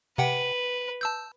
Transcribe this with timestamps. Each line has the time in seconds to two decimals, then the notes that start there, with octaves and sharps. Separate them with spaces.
0.18 C3 B4 F#5 G5
1.01 A5 E6 G6